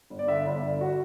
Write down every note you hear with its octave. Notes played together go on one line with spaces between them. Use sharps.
G1
D5
D3 E5
G1
D3
F#4